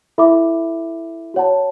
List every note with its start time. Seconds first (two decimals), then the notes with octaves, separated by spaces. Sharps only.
0.18 E4 A4 E5 B5 D6
1.34 F#4 C#5 F#5 A5